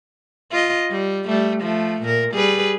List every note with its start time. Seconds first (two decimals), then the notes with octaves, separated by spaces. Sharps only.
0.51 F4 D#5
0.90 G3
1.26 G3 A3
1.61 F3 A3
2.02 A#2 A#4
2.32 G3 G#4 B4